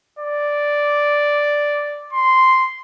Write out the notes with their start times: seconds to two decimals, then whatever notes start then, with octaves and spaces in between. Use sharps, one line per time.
0.19 D5
2.13 C6